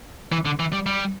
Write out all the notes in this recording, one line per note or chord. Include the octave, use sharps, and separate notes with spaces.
E3
D3
E3
G3
G3